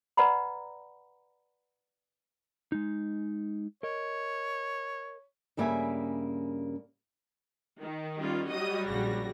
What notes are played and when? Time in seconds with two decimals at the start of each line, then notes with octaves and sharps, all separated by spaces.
0.17 B4 D5 F#5 A#5 B5
2.72 G#3 D#4
3.83 A#4 C#5 D#5
5.57 G2 C#3 G3 A#3 E5 G#5
7.81 D#3
8.17 G3 C#4 F4
8.49 F#3 G3 F#4 D#5 D#6
8.87 A#1 C#3 A#6